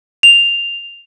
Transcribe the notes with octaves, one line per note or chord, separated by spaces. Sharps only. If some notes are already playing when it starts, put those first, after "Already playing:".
F7